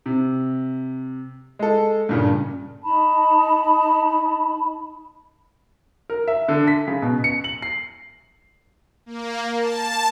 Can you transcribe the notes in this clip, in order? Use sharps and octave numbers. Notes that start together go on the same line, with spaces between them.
C3
G#3 A4
G2 A#2 C#3
D#4 A5 B5
A#4
E5
D3
B6
C#3
B2
C#7
F#7
C7
A#3
A5